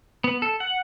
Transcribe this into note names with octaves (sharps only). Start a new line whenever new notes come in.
B3
A4
F#5